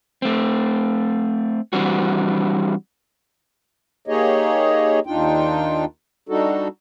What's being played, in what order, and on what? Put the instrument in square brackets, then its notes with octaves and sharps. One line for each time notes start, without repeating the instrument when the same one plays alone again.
[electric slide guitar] A3 C4
E3 G3 C4 D4 F#4
[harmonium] A#3 D#4 G4 G#4 C#5 D#5
D#2 D4 D#4 F4 G5
G3 D4 D#4 F#4 A4